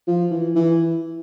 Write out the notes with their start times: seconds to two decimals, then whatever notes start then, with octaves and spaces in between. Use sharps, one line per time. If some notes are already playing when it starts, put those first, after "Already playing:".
0.07 F3
0.31 E3
0.55 E3